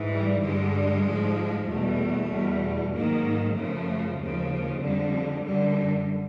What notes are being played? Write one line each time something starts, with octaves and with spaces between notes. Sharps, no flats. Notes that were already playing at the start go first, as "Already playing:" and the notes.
Already playing: G#2 E3
G3
G2 D3 G3 G#3
G#2 F3
E2 B2 G3 A3
E2 B2 G3
G#2 D#3 F#3 A#3
F#2 C#3 F3 A3
D#2 C#3 F3 G#3
F2 D3 G3
F#2 D3 G3